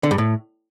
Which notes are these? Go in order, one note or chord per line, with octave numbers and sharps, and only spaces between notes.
D3
G2
A2